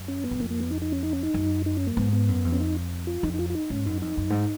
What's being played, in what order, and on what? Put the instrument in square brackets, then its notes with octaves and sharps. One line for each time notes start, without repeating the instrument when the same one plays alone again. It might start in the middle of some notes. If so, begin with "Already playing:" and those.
Already playing: [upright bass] F#2
[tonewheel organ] C#4
B3
[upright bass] F#2
[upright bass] F2 [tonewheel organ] A#3
[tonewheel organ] A#3
B3
D#4
D#4
C#4
D#4
C#4
D#4
[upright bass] F#2
[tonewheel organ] D#4
C#4
A#3
[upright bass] G#2 [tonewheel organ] B3
[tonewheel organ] B3
[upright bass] F#2
F2
[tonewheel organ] C#4
D#4
F4
[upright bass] F2 [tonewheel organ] D#4
[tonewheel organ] D#4
F4
F4
D#4
[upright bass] G#2 [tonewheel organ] C#4
[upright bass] F#2 [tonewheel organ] D#4
[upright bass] F2 [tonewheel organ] D#4
[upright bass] F#2
G#2